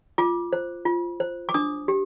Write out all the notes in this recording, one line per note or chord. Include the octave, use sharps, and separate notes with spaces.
F4 D6
C5
F4
C5
D6
D4 D#6
G4